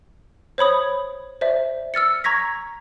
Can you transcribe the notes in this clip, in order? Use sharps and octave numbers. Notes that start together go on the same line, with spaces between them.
C5 C#5 B5 D#6
C5 D5 E5
E6 F6 A6 C#7
A#5 C#6 G#6 A#6 B6